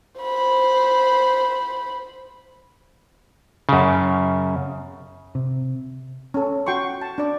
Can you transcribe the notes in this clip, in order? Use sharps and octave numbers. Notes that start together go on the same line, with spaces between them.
C5 B5
F#2 C#3
C3
C#4 A4
F#4 G5 C6 C#6
A5
D4 D5